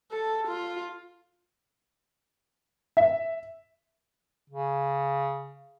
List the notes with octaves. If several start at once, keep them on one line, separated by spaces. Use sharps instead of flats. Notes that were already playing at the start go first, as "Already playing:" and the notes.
A4
F4
E5
C#3